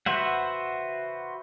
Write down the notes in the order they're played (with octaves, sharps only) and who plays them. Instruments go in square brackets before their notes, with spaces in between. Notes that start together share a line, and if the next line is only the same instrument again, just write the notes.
[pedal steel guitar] F#4 B4 C5 E5 F#5